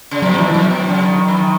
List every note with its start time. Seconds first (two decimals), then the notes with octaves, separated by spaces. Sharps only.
0.11 C#3
0.22 B2 F#3
0.38 A#2 E3
0.54 B2 F#3
0.71 B2
0.88 C#3
1.04 D#3
1.28 E3
1.36 D#3